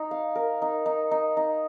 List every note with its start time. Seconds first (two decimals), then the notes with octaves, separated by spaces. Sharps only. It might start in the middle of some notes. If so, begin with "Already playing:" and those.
Already playing: D#4
0.11 F5
0.35 A#4
0.62 D#4
0.86 D#4
1.11 D#4
1.37 D#4